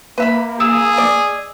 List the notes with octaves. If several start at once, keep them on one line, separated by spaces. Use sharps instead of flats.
A#3 B4 E5 B5
G#4 D#6 E6 E7
D5 D#5